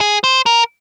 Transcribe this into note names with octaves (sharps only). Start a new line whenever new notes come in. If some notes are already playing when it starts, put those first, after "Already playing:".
G#4
C5
A#4